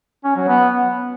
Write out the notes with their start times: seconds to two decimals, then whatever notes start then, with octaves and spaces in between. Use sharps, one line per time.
0.24 C#4
0.36 F#3
0.48 B3